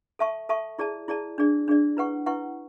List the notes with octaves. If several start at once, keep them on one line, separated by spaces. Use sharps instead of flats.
A4 E5 A5 C#6
A4 E5 A5 C#6
E4 G#4 D5 A5
E4 G#4 D5 A5
D4 G#4 D5
D4 G#4 D5
E4 B4 F#5 C#6
E4 B4 F#5 C#6